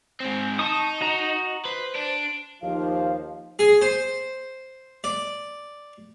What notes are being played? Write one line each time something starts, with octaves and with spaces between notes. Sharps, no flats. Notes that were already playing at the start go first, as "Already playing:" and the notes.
G#2 C4
D#4 A5 C#6 D#6
F#4 D#5 A#5
B4 C5
D4
D#2 F3 F5
G#4
C5
D5